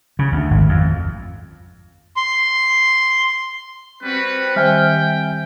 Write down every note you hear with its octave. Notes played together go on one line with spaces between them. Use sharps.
C#3
D2
G#1
F2
C6
G3 C4 F#4 B4
D#3 G3 C5 E5 G5 G#5 F6